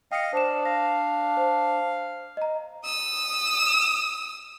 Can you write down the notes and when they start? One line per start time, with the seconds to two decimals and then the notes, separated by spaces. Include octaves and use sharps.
0.12 D#5 F5 G5 C#7
0.33 D4 C5 D5 E7
0.65 F5 A#6
1.37 C5
2.37 D#5 A#5
2.85 D#6 E6